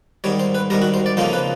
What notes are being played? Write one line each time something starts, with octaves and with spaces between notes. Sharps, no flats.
G#2 D#3 G3 C#5
C5
B4
G#2 D#3 G3 A#4
F#4
C5
D5
F2 C#3 F3 A#3 D#4 C5
B4